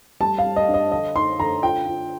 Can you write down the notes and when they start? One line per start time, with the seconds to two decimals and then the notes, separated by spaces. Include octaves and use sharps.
0.20 G3 A5
0.38 F5
0.44 G3
0.56 D#5
0.68 D4
0.74 D#5
0.92 D3 D#5
1.16 D#4 C6
1.40 D3 A#5
1.63 F4 G5
1.86 F4